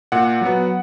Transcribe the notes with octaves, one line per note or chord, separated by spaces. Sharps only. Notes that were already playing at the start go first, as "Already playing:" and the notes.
A#2 F#5
F#3 B3